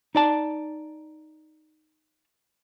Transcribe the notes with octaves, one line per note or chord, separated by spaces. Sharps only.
D#4 D5 A5